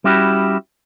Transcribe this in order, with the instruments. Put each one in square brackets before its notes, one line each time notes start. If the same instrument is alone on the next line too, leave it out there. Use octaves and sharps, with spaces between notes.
[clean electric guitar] G3 C#4 E4 F#4 G4